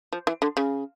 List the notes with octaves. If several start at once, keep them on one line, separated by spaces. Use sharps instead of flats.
F3
E3
D3
C#3